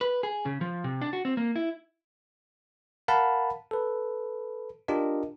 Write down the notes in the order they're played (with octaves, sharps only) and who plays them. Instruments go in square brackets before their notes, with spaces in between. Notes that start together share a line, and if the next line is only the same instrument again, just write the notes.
[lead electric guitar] B4
G#4
C#3
F3
C3
D4
F#4
C4
A#3
E4
[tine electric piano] A#4 F5 F#5 A5 B5
A4 B4
D4 F4 G4 A#4 D#5